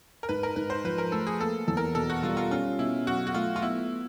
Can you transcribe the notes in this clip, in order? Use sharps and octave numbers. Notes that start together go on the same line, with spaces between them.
A#4
G#2 B4
A#4
G#2 B4
C5
F3 B4
A#4
A3 A4
G#4
A#3 A4
E2 A4
A#4
B2 A4
F#4
G3 F4
F4
C#4 F4
B2 E4
F#3 F#4
F#4
A3 F4
F4
B3 E4